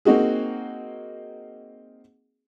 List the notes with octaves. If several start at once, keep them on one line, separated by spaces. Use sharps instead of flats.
A#3 C4 D#4 F#4 G#4